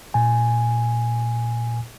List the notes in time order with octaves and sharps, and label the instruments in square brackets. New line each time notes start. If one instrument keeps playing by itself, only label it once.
[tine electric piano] A#2 G#5